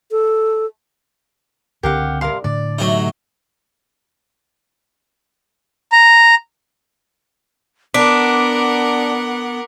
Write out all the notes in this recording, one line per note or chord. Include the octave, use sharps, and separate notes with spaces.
A4
C#2 D3 C4 G4 A#4 F5 F#5
G2 C3 A#4 F5 C6
A2 D3 D4 D5
C3 F#3 A3 D#4
A#5
B3 D4 A#4 F#5 D6 B6 D7